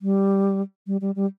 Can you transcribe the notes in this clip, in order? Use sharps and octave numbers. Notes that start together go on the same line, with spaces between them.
G3
G3
G3
G3